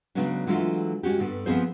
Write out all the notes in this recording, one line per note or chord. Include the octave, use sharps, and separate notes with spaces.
C#3 F#3 G#3 B3 C#4 D4
D3 E3 F#3 G#3 A3 F4
G#3 C#4 F#4 G4
G2 D3 B3 D4
F3 B3 C4 G#4 C5